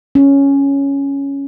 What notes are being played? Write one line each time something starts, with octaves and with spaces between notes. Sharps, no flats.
C#4